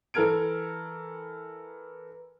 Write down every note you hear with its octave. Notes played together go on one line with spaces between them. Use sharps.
E3 A4 A#4 F6 G#6 D7